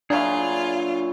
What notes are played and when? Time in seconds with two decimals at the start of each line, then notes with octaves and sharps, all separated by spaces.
0.10 A#2 F#3 D4 E4 F4 G#4